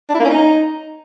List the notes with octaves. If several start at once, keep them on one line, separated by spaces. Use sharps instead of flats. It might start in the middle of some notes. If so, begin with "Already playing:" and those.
D4
E4
A#3
C#4
D#4